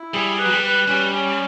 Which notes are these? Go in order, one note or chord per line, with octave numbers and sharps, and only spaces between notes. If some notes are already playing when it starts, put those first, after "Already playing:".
Already playing: E4
G3 G#4
B4
F#3
G3
B4
G3 C#4
C#4